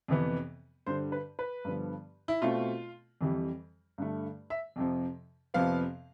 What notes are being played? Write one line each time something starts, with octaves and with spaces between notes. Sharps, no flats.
F2 C3 E3 B3
G2 D3 G3 C5
B4
B4
G2 D3 F3 B3
E4
B2 A3 C4 F4
F2 E3 G3
G2 D3 A3
E5
F2 C3 F3
F2 C3 F3 B3 F5